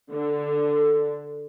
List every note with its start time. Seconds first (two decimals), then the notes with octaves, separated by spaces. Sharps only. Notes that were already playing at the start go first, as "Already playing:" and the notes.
0.12 D3